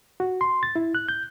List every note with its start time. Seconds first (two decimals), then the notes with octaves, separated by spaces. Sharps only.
0.20 F#4
0.41 C6
0.63 A6
0.76 E4
0.95 F#6
1.09 G6